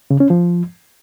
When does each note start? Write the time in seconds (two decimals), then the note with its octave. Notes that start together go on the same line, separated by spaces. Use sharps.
0.10 C#3
0.20 C#4
0.30 F3